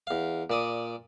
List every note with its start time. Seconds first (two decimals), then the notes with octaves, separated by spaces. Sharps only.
0.07 E2 F5
0.50 A#2 D5 D#6